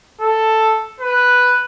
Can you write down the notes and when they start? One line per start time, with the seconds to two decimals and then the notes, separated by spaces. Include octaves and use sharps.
0.21 A4
1.00 B4